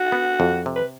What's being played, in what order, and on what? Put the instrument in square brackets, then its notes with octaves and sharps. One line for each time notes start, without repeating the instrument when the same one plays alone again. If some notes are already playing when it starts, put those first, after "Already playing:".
Already playing: [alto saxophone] F#4
[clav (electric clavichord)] B3
F2
C3
[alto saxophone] B4